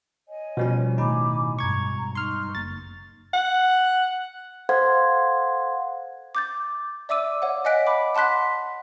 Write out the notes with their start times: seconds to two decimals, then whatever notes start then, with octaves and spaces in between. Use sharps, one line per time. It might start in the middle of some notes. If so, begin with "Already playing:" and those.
0.28 C#5 D#5 G#5
0.57 A#1 B2 F3 G3 C#4
0.98 D#2 A2 D#3 D#4 G#5 B5 D6
1.59 E1 G2 A#5 C#6 G#6
2.15 D#4 C6 C#6 F6
2.55 F#1 A#3 A6
3.34 F#5
4.69 A4 C5 F5 F#5 C6 G#6
6.35 D6 G6 A6
7.09 D5 E5 D6 E6 D#7
7.42 C#5 F5 F#5
7.65 D#5 F#5 G#5 F#6 B6 D7
7.87 B5 D6
8.15 F#5 A5 C6 F#6 B6